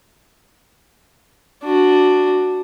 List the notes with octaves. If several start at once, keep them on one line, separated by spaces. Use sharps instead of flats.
D4 F#4